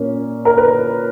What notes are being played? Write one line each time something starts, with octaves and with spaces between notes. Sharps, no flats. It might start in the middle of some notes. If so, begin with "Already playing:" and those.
Already playing: A#2 A#3 C#4
A#4
B4